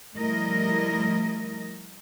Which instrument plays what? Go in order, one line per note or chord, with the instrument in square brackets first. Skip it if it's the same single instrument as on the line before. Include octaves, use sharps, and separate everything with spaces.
[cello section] F3 G3 A3 E4 A#4 D#5